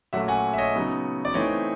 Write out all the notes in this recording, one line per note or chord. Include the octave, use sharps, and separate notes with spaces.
A#2 F#3 A3 C#4 E5 F#5
F#5 G#5
E5
C#5 D#5
C#3 F#3 B3 D#4
D5
E3 A3 C4 D#4 C#5 D#5